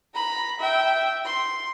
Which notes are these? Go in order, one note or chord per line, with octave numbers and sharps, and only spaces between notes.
A#5 B5
E5 G5
C6